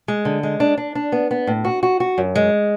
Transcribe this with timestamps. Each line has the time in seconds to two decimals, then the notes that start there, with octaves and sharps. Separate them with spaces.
0.08 G#3
0.25 D3
0.43 G#3
0.60 D4
0.77 D4
0.95 D4
1.12 B3
1.31 B3
1.47 A2
1.65 F#4
1.83 F#4
2.00 F#4
2.18 F#2
2.35 G#3